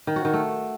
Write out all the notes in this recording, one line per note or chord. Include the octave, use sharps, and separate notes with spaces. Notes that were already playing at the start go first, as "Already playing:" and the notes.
D#3
F#4
D#3
A3